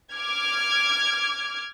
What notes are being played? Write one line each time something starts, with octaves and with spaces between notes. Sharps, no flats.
D6 F6 G#6